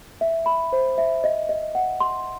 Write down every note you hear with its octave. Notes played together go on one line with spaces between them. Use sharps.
E5
B5
C5
E5
D#5
D#5
F#5
C6